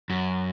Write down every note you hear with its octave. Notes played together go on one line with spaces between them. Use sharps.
F#2